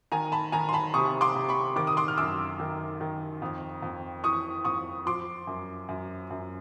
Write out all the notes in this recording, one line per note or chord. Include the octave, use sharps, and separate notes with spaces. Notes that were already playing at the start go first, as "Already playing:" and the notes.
D#3 G#5 A#5
A5 B5
D#3 G#5 A#5
C6
A5 B5
C3 C#6 D#6
C6 D6
C3
B5 C#6
D#3 D6
D#6
C6 D6
F6
F#2 D6 E6
D#3
D#3
F2
F2
E3 C#6 D#6
F2 C#6 D#6
F3 C6 D6
F#2
F#2
F#2